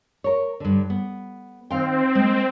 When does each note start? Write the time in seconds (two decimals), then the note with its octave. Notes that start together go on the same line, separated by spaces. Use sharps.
0.24 A#4 C#5
0.60 G2 D3
0.90 B3
1.71 D#3 C4 F5 G5
2.15 G#3 A#3